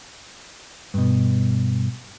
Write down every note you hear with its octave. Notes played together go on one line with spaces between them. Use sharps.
G2 B2